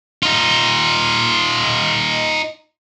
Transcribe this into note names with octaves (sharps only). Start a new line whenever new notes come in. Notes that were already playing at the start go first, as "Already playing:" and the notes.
D#4 F4